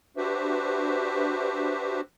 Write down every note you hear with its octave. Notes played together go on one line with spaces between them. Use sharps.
D4 F#4 G4 B4 C5 E5